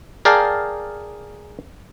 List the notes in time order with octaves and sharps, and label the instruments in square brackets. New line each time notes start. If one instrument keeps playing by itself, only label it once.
[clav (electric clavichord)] G#4 A#4 D5 F5 G5 A5